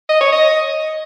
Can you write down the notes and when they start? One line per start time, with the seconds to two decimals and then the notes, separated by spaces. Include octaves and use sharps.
0.09 D#5
0.21 C#5
0.32 D#5